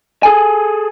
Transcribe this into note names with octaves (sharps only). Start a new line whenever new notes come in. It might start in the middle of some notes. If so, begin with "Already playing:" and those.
G#4 A4 G#5